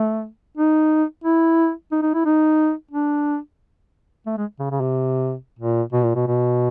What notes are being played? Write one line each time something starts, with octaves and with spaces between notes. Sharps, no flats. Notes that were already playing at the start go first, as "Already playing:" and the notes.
Already playing: A3
D#4
E4
D#4
D#4
E4
D#4
D4
A3
G#3
C#3
C#3
C3
A#2
B2
A#2
B2
B2